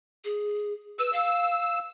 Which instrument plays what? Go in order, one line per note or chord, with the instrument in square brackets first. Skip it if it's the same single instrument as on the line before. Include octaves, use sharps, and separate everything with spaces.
[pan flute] G#4
[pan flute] B4 [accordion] E6
[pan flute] F5